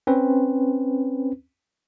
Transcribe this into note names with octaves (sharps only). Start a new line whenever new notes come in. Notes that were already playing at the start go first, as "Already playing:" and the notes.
C4 C#4 B4